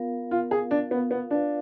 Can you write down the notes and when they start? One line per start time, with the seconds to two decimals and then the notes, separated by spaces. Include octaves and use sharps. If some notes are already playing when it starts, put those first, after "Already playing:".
Already playing: B3 F4 A#4 F5
0.31 F4
0.51 G#4
0.71 D4
0.91 B3
1.11 B3
1.30 D4 F4 B4 F5